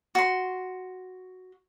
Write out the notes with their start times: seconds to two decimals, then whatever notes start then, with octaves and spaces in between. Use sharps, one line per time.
0.15 F#4 C6